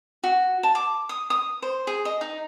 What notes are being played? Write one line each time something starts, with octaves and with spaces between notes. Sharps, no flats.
F#4
A5
D6
D#6
D#6
C5
G#4
D#5
D#4